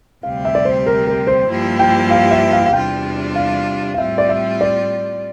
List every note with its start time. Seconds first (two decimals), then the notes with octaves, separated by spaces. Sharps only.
0.23 D2 C3 G3 C4 G4 F5
0.45 E5
0.55 D5
0.65 C5
0.86 A#4
1.07 A#4
1.27 C5
1.48 G2 F3 A#3 E4 G4
1.79 G5
2.11 F5
2.31 E5
2.53 F5
2.66 F5
2.73 E2 C3 G3 D4 F4 G5
3.35 F5
3.94 F5
3.98 A2 G3 C4 F4 E5
4.18 D5
4.29 E5
4.61 D5